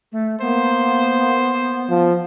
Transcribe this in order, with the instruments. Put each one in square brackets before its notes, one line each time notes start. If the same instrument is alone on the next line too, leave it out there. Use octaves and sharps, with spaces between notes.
[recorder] A3
[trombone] A#3 [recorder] B3 [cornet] C5
[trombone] F3